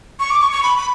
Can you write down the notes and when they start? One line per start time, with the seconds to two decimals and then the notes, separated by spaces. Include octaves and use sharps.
0.19 C#6
0.31 D6
0.41 C#6
0.52 C#6
0.63 B5
0.78 B5